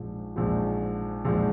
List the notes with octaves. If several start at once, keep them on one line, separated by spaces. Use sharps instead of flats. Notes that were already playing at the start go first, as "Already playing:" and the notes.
Already playing: A#1 G#2 F3
A#1 G#2 F3
A#1 G#2 F3